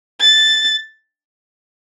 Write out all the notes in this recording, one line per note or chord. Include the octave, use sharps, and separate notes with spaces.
A6